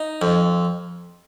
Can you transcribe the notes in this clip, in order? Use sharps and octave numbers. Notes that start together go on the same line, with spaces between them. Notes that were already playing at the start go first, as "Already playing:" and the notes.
Already playing: D#4
F2